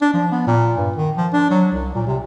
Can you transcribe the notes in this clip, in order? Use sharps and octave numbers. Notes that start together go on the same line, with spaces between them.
D4
F3
B3
A#2
G2
D#3
F3
D4
F#3
C2
A#2
C3